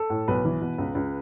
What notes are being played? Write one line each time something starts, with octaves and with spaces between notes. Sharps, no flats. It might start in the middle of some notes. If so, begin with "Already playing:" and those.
Already playing: A4
A2
B1 B4
E3
B2
C#2
C#2